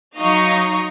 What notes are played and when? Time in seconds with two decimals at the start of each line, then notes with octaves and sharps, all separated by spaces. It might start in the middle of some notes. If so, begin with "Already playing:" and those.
0.18 F#3 D#4 D#5 F5 A#5 C#6